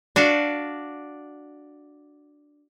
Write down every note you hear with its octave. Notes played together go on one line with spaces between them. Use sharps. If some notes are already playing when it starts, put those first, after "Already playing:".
D4 F#4 F5